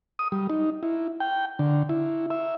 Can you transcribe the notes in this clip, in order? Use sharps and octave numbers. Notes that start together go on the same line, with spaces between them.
D#6
G3
D#4
E4
G5
D3
E4
E5